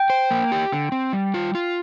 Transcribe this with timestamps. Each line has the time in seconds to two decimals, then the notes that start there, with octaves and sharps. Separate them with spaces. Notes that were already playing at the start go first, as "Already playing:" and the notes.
Already playing: G5
0.10 C5
0.31 A#3
0.52 G4
0.72 D3
0.92 C4
1.13 G3
1.34 F4
1.55 F4